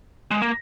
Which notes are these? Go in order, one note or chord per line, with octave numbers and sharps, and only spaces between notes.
G#3
A#3